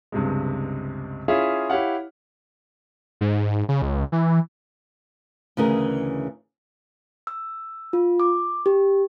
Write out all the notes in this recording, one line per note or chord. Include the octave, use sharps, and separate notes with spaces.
C#2 G2 C3 G#3
C#4 E4 F4 G#4 E5 F5
E4 G4 C#5 F5 F#5
G#2
C#3
C#2
E3
D2 C#3 E3 G#4 A#4
E6
F4
D6
G4